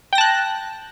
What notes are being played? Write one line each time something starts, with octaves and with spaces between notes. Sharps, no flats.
G5 A5 F#6 A#6